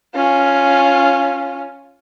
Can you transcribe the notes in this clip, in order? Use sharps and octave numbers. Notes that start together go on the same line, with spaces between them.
C#4 F4